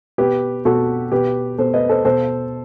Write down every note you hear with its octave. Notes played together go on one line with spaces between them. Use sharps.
B2 G4 B4
B2 F#4 A4
B2 G4 B4
B2 A4 C5
B4 D#5
A4 C5
B2 A4 C5